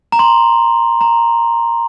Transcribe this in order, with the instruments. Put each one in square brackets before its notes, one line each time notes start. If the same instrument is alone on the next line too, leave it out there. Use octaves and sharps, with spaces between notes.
[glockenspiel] A#5
C6
A#5